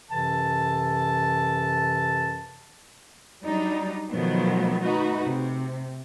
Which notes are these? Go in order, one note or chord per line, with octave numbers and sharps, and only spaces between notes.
F#2 C3 E3 A4 A5
F#3 G3 D4 D#4
B2 D#3 F3 F#3 A3 B3
A3 D#4 F#4 B4
C3